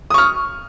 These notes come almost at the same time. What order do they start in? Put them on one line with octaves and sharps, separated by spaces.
D#6 C#6 F6